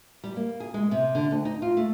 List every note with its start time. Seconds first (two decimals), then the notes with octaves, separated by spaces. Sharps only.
0.24 G3
0.36 A#3
0.60 G#4
0.74 G#3
0.91 C3
1.15 D3
1.31 D2
1.45 D#4
1.62 F4
1.77 A3